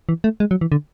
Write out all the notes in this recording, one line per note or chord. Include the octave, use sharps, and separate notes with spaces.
E3
A3
G#3
F#3
E3
D3